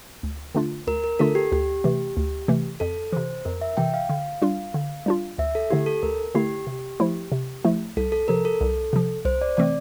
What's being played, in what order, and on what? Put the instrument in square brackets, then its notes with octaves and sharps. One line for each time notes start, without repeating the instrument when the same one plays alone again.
[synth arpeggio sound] D2
D3 A3 D4 F4
[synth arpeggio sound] D2 [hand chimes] A#4
[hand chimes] A#4
[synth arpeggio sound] D3 A3 D4 F4 [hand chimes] A4
[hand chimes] G4
[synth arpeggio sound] D2 [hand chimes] G4
[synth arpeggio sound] C3 E3 A3
D2
C3 E3 A3
[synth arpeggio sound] F2 [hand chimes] A4
[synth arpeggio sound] C3 E3 [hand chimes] C5
[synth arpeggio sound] F2 [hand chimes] A#4
[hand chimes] E5
[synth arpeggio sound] C3 E3 [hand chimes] G5
[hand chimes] F5
[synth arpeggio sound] D3
G3 D4 F4
D3
G3 D4 F4
[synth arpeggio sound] D2 [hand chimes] E5
[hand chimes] A4
[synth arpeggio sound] D3 A3 E4 [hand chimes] G4
[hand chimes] A4
[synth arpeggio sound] D2 [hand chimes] A#4
[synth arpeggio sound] D3 A3 E4 [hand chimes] G4
[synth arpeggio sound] C3
F3 A3 E4
C3
F3 A3 E4
[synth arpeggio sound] C2 [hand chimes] A4
[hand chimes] A4
[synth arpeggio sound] C3 F3 [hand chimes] A#4
[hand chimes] A4
[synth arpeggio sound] C2
C3 F3
[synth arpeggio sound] C2 [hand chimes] C5
[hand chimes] D5
[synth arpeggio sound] C3 E3 A3 C4 [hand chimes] D5